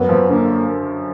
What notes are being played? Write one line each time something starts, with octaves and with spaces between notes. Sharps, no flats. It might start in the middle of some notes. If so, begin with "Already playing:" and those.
Already playing: F#2 B3
F3
D3 A#3